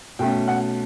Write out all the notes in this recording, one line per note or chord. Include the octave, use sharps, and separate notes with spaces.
B2 A3 C#4 G5
F#5